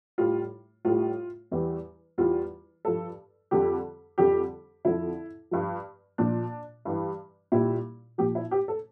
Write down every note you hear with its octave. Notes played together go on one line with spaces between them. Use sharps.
A2 G3 F4
A2 G3 F4
E2 E3 G3
E2 E3 G3 F4
G2 F3 A4
F2 D3 G3 G4
F2 D3 G3 G4
F2 D3 F3 E4
G2 F3
A#2 F3 D4
G2 E3 G3
A#2 G3 E4
A#2 F3 G4
E4
G4
A4